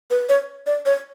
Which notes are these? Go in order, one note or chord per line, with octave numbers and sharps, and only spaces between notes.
B4
C#5
D5
C#5